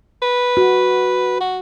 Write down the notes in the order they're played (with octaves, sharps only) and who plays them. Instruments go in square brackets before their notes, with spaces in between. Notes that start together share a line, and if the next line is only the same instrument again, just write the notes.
[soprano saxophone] B4
[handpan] F#4
[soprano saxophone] F#4